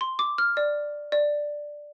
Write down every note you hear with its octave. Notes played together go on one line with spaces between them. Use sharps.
C6
D6
F6
D5
D5